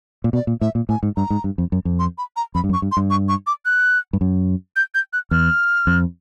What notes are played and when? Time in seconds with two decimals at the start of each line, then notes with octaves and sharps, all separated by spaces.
0.24 A#2
0.33 B2 D5
0.47 A#2
0.61 A2 E5
0.75 A#2
0.89 A2 G#5
1.03 G#2
1.17 G2 A#5
1.30 G#2
1.44 G2
1.58 F2
1.72 F#2
1.85 F2
1.99 C6
2.18 B5
2.36 A#5
2.55 F2 B5
2.64 G2
2.69 F#2
2.73 C#6
2.82 G2
2.92 C6
2.97 G2
3.10 C#6
3.29 C#6
3.47 D6
3.65 F#6
4.13 G2
4.21 F#2
4.76 G6
4.95 G6
5.13 F#6
5.31 E2 F6
5.87 F2